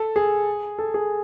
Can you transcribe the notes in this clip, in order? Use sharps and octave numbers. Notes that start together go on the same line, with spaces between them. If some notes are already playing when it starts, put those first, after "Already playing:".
Already playing: A4
G#4
A4
G#4